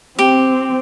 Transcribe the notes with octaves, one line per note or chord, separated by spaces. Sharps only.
C4 G4